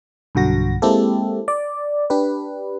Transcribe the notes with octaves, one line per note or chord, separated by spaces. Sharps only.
B1 G2 D3 F#4 A#6
G#3 A#3 C4 E4 G4 A4
D5
D4 G4 B4